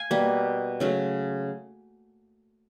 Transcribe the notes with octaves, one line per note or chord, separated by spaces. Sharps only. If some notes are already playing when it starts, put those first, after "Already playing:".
Already playing: F5 G#5
B2 G3 A#3
C#3 F#3 A3